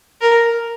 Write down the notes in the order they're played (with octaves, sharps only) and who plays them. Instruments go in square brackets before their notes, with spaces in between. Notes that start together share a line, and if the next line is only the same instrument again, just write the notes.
[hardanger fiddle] A#4